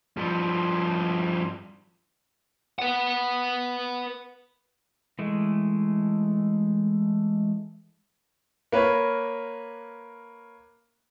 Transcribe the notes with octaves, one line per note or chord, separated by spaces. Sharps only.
G2 F3
B4 F#5
E3 G#3 A3
A#3 B4 C#5